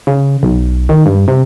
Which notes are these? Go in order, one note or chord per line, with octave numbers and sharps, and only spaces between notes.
C#3
B1
D#3
G2
C3